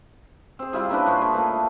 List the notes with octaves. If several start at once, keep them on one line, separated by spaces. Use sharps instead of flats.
C4 G#4
G3 E4 F4 G#4
A#3 C#4 D4 B4
A#2 F4 C5 C#6
G#4 A5
A#2 A3 A#4 B4